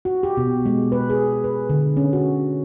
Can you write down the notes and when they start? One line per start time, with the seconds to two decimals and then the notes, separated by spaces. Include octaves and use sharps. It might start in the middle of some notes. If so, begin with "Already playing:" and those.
0.05 F#4
0.23 G4
0.37 B2
0.66 G#3
0.92 B4
1.10 G#4
1.44 B4
1.70 D3
1.97 C#4
2.13 F#4